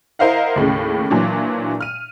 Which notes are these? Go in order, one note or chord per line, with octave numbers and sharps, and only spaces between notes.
E4 A#4 C5 D#5 F5 F#5
D#2 A2 C#3
A#2 E3 F#3 D4
F6 D#7